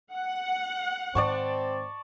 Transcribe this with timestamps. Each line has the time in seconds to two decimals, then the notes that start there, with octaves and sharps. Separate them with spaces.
0.13 F#5
1.15 G#2 D#3 C4 D5 A5 C#6